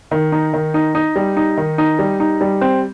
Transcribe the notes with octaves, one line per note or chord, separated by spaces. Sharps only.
D#3
D#4
D#3
D#4
D#4
G3
D#4
D#3
D#4
G3
D#4
G3
C4